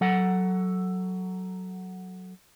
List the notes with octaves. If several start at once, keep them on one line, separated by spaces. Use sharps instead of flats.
F#3 A4 F#5